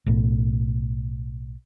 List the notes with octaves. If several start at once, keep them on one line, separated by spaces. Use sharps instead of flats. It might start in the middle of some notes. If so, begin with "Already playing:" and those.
B1 A2